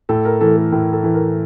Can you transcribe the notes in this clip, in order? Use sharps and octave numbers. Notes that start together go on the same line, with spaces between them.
A2 A4
A#4
E3 A3 A4
A4
A2
A4
E3 A3
A#4